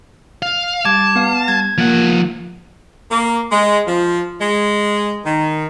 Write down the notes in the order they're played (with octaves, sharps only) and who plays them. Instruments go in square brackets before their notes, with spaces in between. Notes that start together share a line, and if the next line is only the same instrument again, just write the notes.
[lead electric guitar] F5
[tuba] G3 [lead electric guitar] A5 [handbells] D6 G#6
[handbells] B3 F5
[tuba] G3 [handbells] G#6
[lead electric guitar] F3 F#5 [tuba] A#3
[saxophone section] A#3
G#3
F3
G#3
D#3